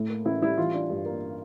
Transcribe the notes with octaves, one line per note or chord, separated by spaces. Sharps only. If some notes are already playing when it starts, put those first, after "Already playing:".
Already playing: A2 A3
A#3
A1 E4
G3 E4
E3 F4
D4
G2
A#3